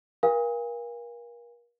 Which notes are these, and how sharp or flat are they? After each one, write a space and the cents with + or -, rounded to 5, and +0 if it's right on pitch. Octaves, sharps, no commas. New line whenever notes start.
A#4 +35 F5 +0 G#5 -40